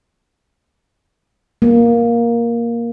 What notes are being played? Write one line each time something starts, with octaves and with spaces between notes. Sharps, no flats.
A#3